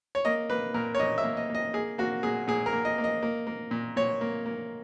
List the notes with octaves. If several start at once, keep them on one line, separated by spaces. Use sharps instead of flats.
C#5
A#3 D#5
A#3 B4
A#2 A#4
C#5
A#2 D#5
E5
A#3
D#5
A#3
D#5
A#3 G#4
A#3 F#4
A#2 G#4
A#2 G#4
A#4
A#3
D#5
A#3
D#5
A#3
A#3
A#2
A#2 C#5
A#3
A#3